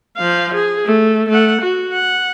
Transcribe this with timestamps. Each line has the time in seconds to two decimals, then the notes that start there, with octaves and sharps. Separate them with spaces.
0.17 F3 F5
0.55 G#4
0.85 A3
1.29 A3 F#5
1.61 F#4
1.93 F#5